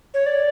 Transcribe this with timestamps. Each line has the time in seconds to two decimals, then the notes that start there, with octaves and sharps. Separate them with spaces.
0.14 C#5
0.26 D5